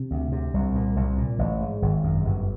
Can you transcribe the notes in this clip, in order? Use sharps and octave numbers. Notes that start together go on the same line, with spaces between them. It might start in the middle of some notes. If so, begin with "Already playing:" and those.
Already playing: C3
D2
C3
C2
A#2
C2
A#2
A1
G#2
G#1
F#2
G1